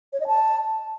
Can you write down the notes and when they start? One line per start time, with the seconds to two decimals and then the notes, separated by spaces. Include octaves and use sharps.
0.13 C#5
0.20 D#5
0.27 A5